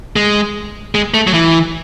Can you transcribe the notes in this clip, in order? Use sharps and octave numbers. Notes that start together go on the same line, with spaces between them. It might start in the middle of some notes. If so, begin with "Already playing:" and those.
G#3
G#3
A3
F#3
E3